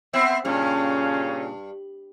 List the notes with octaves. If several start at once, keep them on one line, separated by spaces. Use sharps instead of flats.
B3 C4 E5
G2 A#2 C#3 C#4